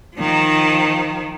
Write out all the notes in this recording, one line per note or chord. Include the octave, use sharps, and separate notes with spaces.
D#3 F3